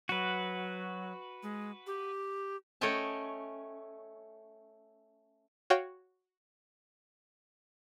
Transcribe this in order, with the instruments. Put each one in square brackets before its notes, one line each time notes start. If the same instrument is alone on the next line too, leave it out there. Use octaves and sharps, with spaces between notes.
[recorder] F#3 [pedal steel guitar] F#4 B4
[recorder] G#3
G4
[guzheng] A3 C#4 C#5 D#5 G5 A5
[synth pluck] F#4 C#5 F5 G5